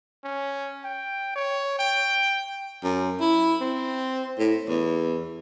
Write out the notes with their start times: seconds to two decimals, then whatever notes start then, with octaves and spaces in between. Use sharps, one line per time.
0.24 C#4
0.84 G5
1.36 C#5
1.79 G5
2.84 F#2
3.20 E4
3.61 C4
4.39 A2
4.68 E2